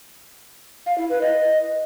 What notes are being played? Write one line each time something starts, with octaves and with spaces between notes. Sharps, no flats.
F5
E4
B4
D#5